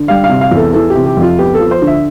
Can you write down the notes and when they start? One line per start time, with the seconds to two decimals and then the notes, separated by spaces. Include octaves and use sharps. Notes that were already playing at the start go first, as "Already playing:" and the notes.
Already playing: D3
0.08 G3 F5
0.24 F5
0.29 C3
0.41 F5
0.51 E2
0.57 A4
0.73 E3 A4
0.90 C3 G4
1.06 G4
1.17 F2
1.22 F4
1.39 B3 G4
1.54 A4
1.60 F3
1.71 C5
1.82 D3
1.87 E5